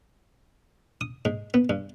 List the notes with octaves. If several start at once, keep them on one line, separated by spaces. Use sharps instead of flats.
D#6
G#2
B3
G2